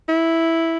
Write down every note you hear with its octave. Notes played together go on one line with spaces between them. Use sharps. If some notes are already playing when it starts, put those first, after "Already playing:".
E4